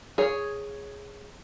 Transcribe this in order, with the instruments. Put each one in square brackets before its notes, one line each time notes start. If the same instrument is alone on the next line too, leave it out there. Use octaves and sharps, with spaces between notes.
[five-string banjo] G#4 C#5